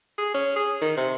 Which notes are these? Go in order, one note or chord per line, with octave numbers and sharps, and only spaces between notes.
G#4
C#4
G#4
D#3
C3